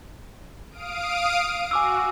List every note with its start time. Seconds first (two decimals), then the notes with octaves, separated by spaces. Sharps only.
0.70 F5 D#6 D7
1.71 F#4 G#5 D6 E6